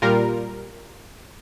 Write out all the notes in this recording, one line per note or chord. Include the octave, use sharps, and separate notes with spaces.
A#2 G3 F4 A#4